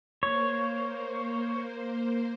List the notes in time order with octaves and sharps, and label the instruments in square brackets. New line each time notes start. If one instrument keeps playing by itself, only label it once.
[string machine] A#3 C5 [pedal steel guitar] C#5